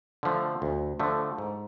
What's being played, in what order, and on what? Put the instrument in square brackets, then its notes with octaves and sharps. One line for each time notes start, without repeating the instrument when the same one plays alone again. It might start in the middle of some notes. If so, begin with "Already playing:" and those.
[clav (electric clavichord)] D3 F3 A3
D2
D3 F3 A3
G#2